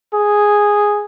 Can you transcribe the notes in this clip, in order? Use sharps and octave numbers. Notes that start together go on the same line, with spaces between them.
G#4